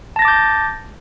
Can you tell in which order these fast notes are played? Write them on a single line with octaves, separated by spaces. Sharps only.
A5 A#6 A6 D6 G6